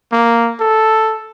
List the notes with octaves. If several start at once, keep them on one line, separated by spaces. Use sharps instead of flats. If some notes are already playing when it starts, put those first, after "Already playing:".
A#3
A4